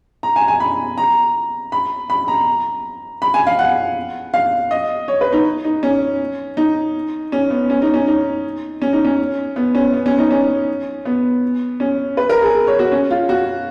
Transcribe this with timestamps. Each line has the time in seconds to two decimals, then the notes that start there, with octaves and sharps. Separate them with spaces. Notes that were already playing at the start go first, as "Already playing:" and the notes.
0.23 A#5
0.36 G#5
0.48 G#5
0.60 B5
0.98 A#5
1.72 B5
2.10 B5
2.28 A#5
3.22 B5
3.34 G#5
3.47 F5
3.59 F#5
4.34 F5
4.71 D#5
5.08 C#5
5.21 B4
5.33 D#4
5.64 D#4
5.83 C#4
6.57 D#4
7.32 C#4
7.50 B3
7.70 C#4
7.82 D#4
7.94 C#4
8.07 D#4
8.82 C#4
8.93 D#4
9.05 C#4
9.56 B3
9.75 C#4
9.93 B3
10.06 C#4
10.18 D#4
10.31 C#4
11.05 B3
11.80 C#4
12.17 B4
12.29 A#4
12.42 G#4
12.67 C#5
12.79 F#4
12.92 C#4
13.10 F4
13.29 F#4